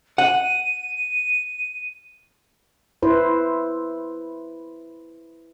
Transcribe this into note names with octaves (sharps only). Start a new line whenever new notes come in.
F#5 D#7
E4 B4 C5